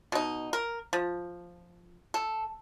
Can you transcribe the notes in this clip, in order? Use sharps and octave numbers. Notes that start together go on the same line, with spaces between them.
B2 D#4
A#4
F3
A4